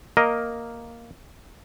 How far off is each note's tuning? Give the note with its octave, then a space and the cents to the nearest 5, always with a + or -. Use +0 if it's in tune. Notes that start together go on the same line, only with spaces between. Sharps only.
A#3 +0 A#4 +0 D#5 +0